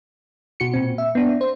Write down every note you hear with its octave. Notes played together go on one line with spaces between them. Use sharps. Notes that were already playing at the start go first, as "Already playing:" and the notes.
B2 F#4 C#7
A#2 C4
E5
B3 D4
C5